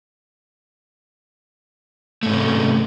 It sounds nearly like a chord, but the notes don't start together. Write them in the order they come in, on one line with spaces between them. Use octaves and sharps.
A3 G#2 C#4 C3